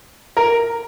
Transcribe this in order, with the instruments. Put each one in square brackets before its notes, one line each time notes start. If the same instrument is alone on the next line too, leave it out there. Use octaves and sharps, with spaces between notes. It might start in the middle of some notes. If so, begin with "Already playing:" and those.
[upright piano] A#4